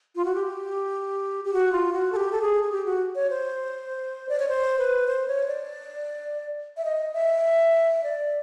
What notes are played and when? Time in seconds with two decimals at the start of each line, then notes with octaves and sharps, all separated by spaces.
0.16 F4
0.25 F#4
0.35 G4
1.44 G4
1.53 F#4
1.72 F4
1.92 F#4
2.12 A4
2.16 G4
2.32 A4
2.41 G#4
2.63 G#4
2.72 G4
2.86 F#4
3.15 C#5
3.30 C5
4.29 D5
4.39 C#5
4.49 C5
4.79 B4
5.07 C5
5.28 C#5
5.48 D5
6.77 E5
6.85 D#5
7.14 E5
8.04 D5